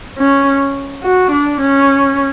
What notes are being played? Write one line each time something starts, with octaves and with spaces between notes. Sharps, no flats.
C#4
F#4
D4
C#4